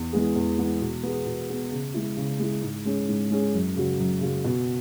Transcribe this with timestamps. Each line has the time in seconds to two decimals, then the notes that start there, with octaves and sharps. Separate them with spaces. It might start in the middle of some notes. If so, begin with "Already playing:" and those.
Already playing: E2
0.13 E3 G#3 B3 G#4
0.36 E2
0.58 E3 G#3 B3 G#4
0.81 B2
1.03 B3 G#4
1.26 B2
1.49 B3 G#4
1.71 C#3
1.94 G#3 E4
2.17 C#3
2.39 G#3 E4
2.62 G#2
2.85 G#3 C#4 G#4
3.08 G#2
3.31 G#3 C#4 G#4
3.54 F#2
3.76 C#3 F#3
3.98 F#2
4.21 C#3 F#3
4.44 B2